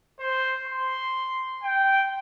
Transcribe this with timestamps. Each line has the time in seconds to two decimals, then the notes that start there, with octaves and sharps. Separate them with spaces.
0.20 C5
0.67 C6
1.63 G5